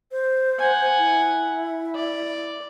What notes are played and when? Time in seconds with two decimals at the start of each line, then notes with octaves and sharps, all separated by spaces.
0.12 C5
0.59 F#5 G#5
0.98 E4
1.95 D5